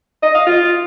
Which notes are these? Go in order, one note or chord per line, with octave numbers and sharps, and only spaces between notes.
D#5
F5
F4